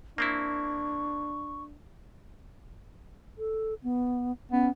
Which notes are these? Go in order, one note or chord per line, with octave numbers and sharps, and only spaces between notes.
A#3 C4 D4 E4 C#6
A4
B3
B3 C#4